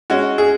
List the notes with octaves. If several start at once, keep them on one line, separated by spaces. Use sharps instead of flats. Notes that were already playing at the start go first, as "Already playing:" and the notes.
G#3 C#4 F#4
G#4